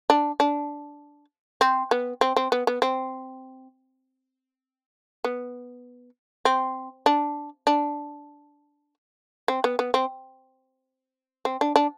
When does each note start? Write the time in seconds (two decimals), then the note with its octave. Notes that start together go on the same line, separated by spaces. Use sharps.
0.10 D4
0.40 D4
1.61 C4
1.91 B3
2.21 C4
2.36 C4
2.52 B3
2.67 B3
2.82 C4
5.24 B3
6.45 C4
7.06 D4
7.67 D4
9.48 C4
9.64 B3
9.79 B3
9.94 C4
11.45 C4
11.61 D4
11.76 D4